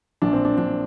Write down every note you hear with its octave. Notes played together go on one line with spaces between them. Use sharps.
A#1 D4
C4
D4
A#1 D4